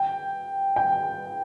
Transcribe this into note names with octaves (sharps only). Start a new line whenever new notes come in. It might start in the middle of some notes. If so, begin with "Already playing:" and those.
Already playing: G5
G5